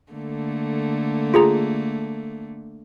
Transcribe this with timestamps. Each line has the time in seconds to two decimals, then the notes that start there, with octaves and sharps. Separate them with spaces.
0.12 D3 A3 A#3
1.34 F4 G#4 A#5